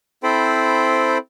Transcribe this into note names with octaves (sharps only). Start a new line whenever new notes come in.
C4 E4 A4 C5 G5 B5